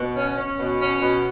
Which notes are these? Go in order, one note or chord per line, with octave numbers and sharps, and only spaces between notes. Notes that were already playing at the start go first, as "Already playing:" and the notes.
Already playing: B2
C#4
C#4
B2
C#4
B2